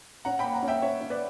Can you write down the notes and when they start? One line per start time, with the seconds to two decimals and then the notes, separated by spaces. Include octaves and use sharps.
0.25 C#4 F#5 A#5
0.39 A#3 G5 B5
0.53 F#5 A#5
0.62 C#4
0.68 E5 G5
0.82 C#4 C#5 E5
1.01 C#4
1.10 B4 D5